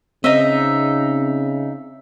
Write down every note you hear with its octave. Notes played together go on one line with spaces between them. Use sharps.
C#3 C4 D#4 D#5 E5